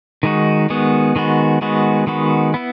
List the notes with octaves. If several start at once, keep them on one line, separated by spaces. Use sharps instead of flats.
D#3 G#3 D#4 F#4
D#3 G#3 B3 F#4
D#3 G#3 B3 F#4
D#3 G#3 B3 F#4
D#3 G#3 B3 F#4
B3 E4